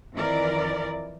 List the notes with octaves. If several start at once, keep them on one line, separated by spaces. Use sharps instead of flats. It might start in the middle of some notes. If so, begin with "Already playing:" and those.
F2 D#3 E3 E4 A#4 D5